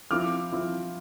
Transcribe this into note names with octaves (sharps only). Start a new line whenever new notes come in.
F3 C4 E4 D6 F6
F3 C4 E4